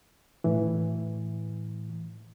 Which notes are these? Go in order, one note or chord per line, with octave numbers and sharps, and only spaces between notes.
A2 E3